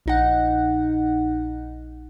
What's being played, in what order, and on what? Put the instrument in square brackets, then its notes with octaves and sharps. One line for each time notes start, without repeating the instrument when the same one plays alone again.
[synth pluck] A#1 D#4 F#5